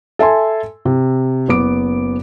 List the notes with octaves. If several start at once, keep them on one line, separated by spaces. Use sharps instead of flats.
A4 E5 G#5 C6
C3
F#1 B3 D6 D7